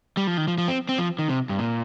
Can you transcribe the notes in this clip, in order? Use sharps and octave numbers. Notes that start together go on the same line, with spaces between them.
G3
F3
D#3
F3
F3
C4
C4
F3
D#3
C3
G2
A#2